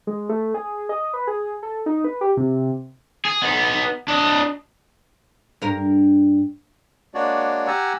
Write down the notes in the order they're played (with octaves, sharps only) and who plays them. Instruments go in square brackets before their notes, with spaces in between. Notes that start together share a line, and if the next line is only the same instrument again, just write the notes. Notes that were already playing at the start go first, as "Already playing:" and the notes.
[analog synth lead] G#3
A3
G#4
D#5
B4
G#4
A4
D#4
B4
G4
C3
[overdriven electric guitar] G#4
B3 D#4
D4 D#5
[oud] G2 A#4
[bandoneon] G#3 A#3 D4 F#4 C#5 D5
G4 F#5 G#5 A#5 E6